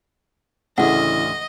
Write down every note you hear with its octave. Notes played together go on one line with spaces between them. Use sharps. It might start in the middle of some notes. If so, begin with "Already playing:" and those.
A1 D2 C#3 E3 D#5 F#5